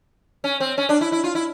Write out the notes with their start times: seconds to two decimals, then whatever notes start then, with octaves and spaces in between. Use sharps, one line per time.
0.44 C#4
0.60 C4
0.78 C#4
0.89 D4
1.01 E4
1.12 E4
1.24 F4
1.35 E4